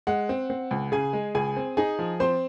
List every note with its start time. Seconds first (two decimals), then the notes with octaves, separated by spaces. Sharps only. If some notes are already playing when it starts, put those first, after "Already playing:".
0.07 G#3 F#5
0.29 C4
0.50 C4
0.71 C#2
0.92 C#3 G#4 G#5
1.13 G#3
1.35 C#2 G#4 G#5
1.56 C4
1.77 D#4 G#4 G#5
1.99 F3
2.20 C4 C5 C6